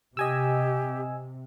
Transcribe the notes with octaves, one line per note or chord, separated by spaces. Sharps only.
C3 G4 D#5 G#5 E6